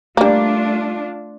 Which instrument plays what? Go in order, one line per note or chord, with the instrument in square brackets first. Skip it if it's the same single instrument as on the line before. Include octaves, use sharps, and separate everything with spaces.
[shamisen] G3 A#3 [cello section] A3 D4 F4